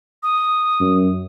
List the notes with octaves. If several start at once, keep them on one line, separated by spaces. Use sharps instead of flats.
D#6
F#2